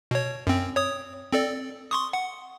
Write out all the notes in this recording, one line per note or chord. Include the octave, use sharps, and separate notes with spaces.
B2 C#5
F#2 C4
C#5 D#6
C4 A4 D5
C6 C#6 D#6
F#5